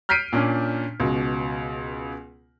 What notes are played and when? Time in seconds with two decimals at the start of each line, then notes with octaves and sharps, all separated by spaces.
0.09 F6 G6 B6 C7 D7 D#7
0.32 A#2 C#4 D4
1.00 C#2 B2